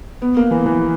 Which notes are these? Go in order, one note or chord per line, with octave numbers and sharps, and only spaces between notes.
B3
A#3
E3
E3